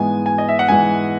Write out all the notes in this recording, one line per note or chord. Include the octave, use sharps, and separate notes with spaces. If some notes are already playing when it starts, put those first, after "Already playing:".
Already playing: G#2 E3 G#3 B3 G#5
G#5
D#5
E5
F#5
G#2 E3 G#3 B3 G#5